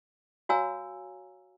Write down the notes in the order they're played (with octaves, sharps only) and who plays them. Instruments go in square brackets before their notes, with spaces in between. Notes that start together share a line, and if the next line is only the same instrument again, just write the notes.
[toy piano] F#4 C#5 F5 G#5 A#5 E6